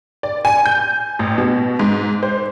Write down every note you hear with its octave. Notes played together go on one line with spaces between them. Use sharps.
D5
G#5
G6
A1
B2
G#2
C5